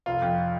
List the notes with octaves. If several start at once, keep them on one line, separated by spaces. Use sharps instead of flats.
F1 F4
F2